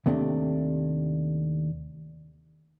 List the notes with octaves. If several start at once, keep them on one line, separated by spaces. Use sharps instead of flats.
D#2 C3 A3 D4